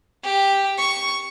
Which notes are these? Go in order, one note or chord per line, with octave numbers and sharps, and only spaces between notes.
G4
C#6